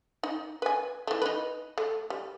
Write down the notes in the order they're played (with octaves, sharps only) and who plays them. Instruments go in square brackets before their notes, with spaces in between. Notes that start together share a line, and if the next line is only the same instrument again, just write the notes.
[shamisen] D#4
B4 G#5
E3 A3
D#4 B4
A3
G3